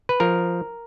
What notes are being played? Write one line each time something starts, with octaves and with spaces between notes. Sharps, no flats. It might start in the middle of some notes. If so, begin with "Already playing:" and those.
B4
F3 A#4